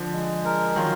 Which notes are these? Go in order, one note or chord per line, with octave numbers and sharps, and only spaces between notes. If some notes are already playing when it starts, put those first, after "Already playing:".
Already playing: D3 F3
G#3
A#4
D#3 F#3 F4